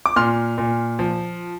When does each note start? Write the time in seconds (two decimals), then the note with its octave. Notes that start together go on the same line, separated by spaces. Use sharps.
0.06 D6
0.16 A#2 C6 F6
0.58 A#2
0.99 F3